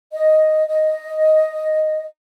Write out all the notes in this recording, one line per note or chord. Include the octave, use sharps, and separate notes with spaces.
D#5
D#5